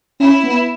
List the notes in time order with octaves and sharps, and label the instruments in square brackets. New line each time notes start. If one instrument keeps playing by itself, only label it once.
[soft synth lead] C#4 [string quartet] E4
[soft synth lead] B3